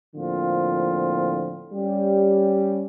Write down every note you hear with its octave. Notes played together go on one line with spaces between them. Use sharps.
A2 D3 F3 A#3 C4 F4
G3 C#4 G4